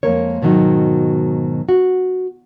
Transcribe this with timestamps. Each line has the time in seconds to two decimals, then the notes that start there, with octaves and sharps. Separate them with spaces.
0.03 F2 G#3 A#3 A#4 C#5
0.42 G#2 B2 D#3 F#3 D#4
1.69 F#4